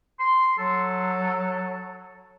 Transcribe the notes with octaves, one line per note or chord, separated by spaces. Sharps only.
C6
F#3 A4